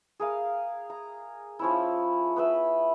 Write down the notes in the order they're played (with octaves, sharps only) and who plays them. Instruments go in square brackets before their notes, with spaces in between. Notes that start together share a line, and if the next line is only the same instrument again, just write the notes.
[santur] G#4 A#4 F5
A#5
F3 C#4 E4
B3 B4 E5